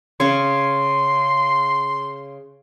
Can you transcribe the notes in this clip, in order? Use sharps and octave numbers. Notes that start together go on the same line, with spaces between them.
C#3 C#4 C#5 C6